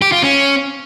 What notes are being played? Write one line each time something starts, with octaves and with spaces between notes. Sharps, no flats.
G4
F4
C#4